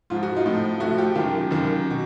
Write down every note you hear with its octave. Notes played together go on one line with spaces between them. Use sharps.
G#2 F3 F4
F#4
D#4 F4
A2 F3
A2 F3 E4 F#4
F4 G4
F#2 D#3 F4 G4
F#2 D#3
B2